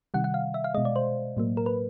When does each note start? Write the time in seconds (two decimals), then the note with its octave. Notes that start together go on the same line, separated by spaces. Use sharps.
0.14 C3 D#3 G3 F#5
0.24 F#5
0.34 F5
0.54 E5
0.64 F5
0.74 G#3 D#5
0.78 B2
0.85 D5
0.96 C5
1.37 A2 F#3 A#3
1.57 A#4
1.66 B4